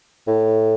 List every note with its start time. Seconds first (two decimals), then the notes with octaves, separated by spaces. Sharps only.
0.28 A2